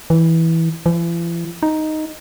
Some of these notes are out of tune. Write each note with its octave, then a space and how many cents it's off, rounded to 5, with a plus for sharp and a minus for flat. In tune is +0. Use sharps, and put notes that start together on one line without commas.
E3 -10
E3 +45
D#4 +0